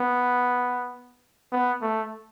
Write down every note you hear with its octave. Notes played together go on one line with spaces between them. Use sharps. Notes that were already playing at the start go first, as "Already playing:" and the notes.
Already playing: B3
B3
A3